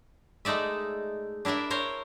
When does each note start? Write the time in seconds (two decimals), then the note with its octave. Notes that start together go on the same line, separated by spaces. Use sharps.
0.45 G#3 A3 D#4 D5 E5
1.45 D4 E4 A#4 D5 E5
1.70 A#4 C5 C#5